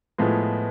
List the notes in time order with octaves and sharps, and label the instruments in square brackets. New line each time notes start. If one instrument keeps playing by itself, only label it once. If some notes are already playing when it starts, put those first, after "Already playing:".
[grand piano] A2 F3 G#3 B3